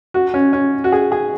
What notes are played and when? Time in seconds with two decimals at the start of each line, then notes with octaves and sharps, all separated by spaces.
0.14 F#4
0.34 C#4
0.53 C#4
0.84 F#4
0.92 G#4
1.12 G#4